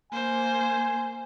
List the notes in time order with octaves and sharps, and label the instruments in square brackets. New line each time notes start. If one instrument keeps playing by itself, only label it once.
[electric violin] A#3 C5 [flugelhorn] G#5